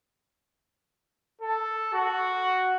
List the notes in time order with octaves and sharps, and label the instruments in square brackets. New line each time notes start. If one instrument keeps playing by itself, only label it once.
[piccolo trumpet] A4
F#4